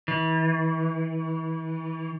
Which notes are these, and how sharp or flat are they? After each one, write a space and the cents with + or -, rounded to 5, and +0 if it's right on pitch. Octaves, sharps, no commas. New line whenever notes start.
E3 -30